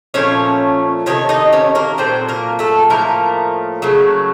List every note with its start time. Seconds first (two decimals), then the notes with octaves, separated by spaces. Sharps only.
0.14 A#2 F3 A3 C#4 C#5
1.06 C3 D#3 A3 C#5
1.29 D#4 D#5
1.53 C#4 C#5
1.75 A#3 A#4
1.98 A#2 F#3 A3 C4 C5
2.29 A#3 A#4
2.59 A3 A4
2.90 A2 F3 A3 A#3 A#4
3.82 C#3 F#3 A3